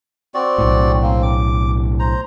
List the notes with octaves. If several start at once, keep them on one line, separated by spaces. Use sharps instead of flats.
C4 F#4 D5
B1 A2
A#3 C4
D6
C5 A#5